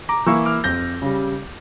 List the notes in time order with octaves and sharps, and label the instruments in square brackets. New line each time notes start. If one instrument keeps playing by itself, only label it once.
[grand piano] A#5 D6
E3 A#3 E4 C#6 E6
D6 F6
F2 G6 A#6
C#3 G3